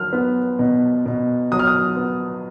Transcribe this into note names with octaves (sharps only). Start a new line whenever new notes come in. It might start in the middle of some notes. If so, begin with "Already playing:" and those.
Already playing: F#3 F6
B3
B2
B2
F#3 D#6
F6
D#6
B3